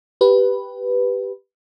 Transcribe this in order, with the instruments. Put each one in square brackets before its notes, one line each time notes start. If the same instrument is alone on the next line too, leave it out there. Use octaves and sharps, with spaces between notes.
[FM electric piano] G4 B4